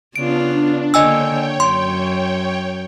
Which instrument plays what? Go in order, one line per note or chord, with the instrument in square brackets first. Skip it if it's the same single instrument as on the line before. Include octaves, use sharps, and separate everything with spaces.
[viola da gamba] C#3 B3 F4 [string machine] D4 [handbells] D7
[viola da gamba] D3 A#3 [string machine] C#5 G5 [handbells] D#5 G#5 E6
[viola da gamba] F#2 [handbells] C6